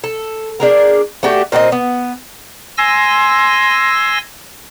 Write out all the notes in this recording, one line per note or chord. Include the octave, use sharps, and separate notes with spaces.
A4
D4 G#4 A#4
A3 D4 F#4 G4
A#2 C4 F#4 D#5
B3
G#5 C6 E6 A#6